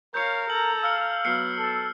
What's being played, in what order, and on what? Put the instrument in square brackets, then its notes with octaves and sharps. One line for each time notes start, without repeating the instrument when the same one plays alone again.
[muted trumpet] A#4 [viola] C#5 F5 [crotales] G6 C#7
[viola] A4 A#5 [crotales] F#7
[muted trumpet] F5 [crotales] E6 F6 C#7
[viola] F#3 B3 [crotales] F6 C7 C#7
[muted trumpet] A4